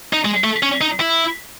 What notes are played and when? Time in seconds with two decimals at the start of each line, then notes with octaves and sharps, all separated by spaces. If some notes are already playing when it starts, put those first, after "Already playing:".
0.13 D#4
0.25 G#3
0.44 A3
0.63 C#4
0.81 D#4
1.00 E4